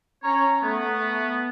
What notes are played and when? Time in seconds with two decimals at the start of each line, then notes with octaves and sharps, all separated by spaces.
0.23 C#4 C#5 A#5
0.63 A3 B3